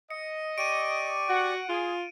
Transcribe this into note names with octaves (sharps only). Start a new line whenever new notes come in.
D#5 C#7
G4 D5 C#6 D7 D#7
F#4 F#5
F4 G#4